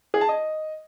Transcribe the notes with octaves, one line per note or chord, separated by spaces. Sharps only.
G#4
A5
D#5